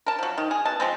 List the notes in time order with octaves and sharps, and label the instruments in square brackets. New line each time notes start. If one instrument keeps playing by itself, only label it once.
[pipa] A#4 A5
F3 F#3
D#3
G#4
B2 A5
F3 G#3 C4